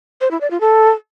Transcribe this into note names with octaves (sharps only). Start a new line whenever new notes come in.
C5
E4
D5
F4
A4